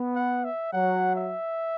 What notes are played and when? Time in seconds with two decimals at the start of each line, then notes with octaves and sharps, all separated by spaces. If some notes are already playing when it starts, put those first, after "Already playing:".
Already playing: B3
0.15 F#5
0.44 E5
0.72 F#3 F#5
1.15 E5